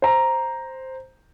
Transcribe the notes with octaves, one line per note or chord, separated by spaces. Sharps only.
C5 A#5